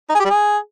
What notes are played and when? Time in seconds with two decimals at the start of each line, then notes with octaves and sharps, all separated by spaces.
0.09 D#4
0.14 G#4
0.20 G4
0.25 G3
0.30 G#4